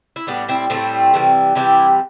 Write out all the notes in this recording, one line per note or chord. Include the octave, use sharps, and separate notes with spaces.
E4
A2 G3 B3 D4
C4 E4
A2 G3 A3 C4
C3 E3 G3
C3 E3 G3 E4 G4